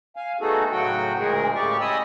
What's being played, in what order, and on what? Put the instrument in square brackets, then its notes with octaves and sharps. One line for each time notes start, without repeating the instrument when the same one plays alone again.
[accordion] F5 G#5
A3 B3 D#4 F#4 G#4 A4
A2 C#3 F#3 F#4 F#5 G5
D2 A#2 G#3 G#4 A#4
A2 C#3 G4 D5 C#6
D#5 G#5 B5 D#6 E6